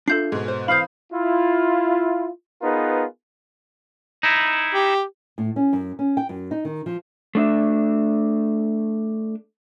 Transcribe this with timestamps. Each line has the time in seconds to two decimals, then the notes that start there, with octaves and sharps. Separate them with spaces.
0.08 D4 F4 A4 E5 G6 C7
0.32 G#2 B2 G#4
0.48 C5
0.68 E3 C4 F5 B5 D#6 G6
1.13 E4 F4
2.62 B3 D#4 F4 G#4 A#4 B4
4.23 D#4 E4
4.74 G4
5.38 A2
5.56 C#4
5.73 F#2
5.99 C#4
6.17 G5
6.29 F#2
6.51 D#4
6.65 D#3
6.86 F3
7.35 A3 D4 E5